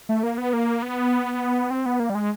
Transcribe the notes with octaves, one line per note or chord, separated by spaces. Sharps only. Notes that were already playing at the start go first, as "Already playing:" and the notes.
A3
A#3
B3
A#3
B3
C4
B3
A#3
G3
G#3